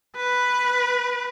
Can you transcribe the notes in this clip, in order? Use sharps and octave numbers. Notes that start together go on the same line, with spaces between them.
B4